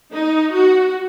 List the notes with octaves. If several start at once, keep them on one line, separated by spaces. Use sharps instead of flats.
D#4
F#4